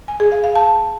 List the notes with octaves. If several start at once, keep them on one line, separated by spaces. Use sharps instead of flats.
G#5
G#4
F5
F5
A5